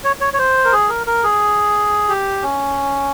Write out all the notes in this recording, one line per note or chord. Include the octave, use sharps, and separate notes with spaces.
C#5
C#5
C#5
C5
A#4
G#4
A#4
A#4
G#4
G4
C#4